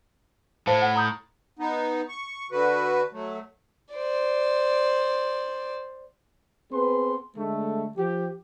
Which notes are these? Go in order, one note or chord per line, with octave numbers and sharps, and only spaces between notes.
A2 C5 F5 A5
F#5
A#5 D#6 G6
B3 D#4
C#6
D3 F#4 B4
F#3 A3
C5 D5
B3 C4 G#4 B4 C6
D3 G#3 A3
F3 G4